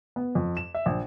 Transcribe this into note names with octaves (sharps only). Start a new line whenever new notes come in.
B3
F2
E7
E5
A#1